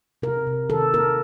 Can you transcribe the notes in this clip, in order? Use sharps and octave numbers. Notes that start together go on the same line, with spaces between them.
C3 A#4
C3
D#3 A4
A#3 A#4